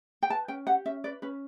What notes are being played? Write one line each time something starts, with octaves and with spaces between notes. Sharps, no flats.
G5
B4 A5
C#4 G5
G4 F#5
C#4 E5
B4 D5
C#4 B4